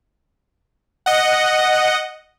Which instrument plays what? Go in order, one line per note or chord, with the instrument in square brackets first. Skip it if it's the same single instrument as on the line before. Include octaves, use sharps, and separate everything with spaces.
[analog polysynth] D#5 F#5